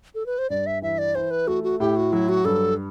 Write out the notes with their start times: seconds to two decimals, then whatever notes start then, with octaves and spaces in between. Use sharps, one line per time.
0.15 A4
0.26 B4
0.38 C5
0.50 G2 D5
0.66 E5
0.82 E3 E5
0.98 D5
1.15 E3 C5
1.31 B4
1.48 A3 F#4
1.64 F#4
1.80 A2 G4
1.96 F#4
2.12 F#3 E4
2.29 F#4
2.45 G2 A4